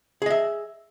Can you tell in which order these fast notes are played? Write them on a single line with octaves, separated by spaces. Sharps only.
G#4 D#5 E5